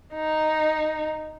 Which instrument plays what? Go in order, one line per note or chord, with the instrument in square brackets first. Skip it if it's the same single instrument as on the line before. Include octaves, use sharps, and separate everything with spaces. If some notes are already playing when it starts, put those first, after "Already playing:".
[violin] D#4